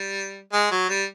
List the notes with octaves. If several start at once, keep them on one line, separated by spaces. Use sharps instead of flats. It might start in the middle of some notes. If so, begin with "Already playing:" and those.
Already playing: G3
G#3
F#3
G3